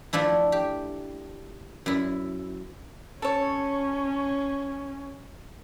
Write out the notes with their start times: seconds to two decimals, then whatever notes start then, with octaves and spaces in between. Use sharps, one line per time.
0.13 F3 A3 D4 E4
0.52 G4
1.86 F#2 E4
3.22 C#4 A4 C#5